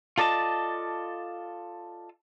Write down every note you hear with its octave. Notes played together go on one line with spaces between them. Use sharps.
F4 A4 D5 D#5 A5